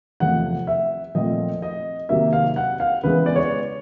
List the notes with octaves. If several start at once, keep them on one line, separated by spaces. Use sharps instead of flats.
E2 C3 F3 A3 F#5
E5
A#2 F3 A3 C4 D#5
D#5
C3 D#3 F#3 A#3 E5
F5
F#5
F5
C#3 E3 G#3 B3 B4
D5
C#5